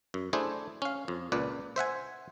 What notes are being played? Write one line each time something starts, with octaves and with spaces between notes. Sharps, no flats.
F#2
A3 D4 E4 G#4 C5
C#4 F5
F2
C#2 A#2 B4 D5
C5 E5 F#5 G#5